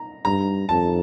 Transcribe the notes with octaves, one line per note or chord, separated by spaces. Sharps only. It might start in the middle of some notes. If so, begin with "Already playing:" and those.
Already playing: A#5
G2 A#5
F2 A5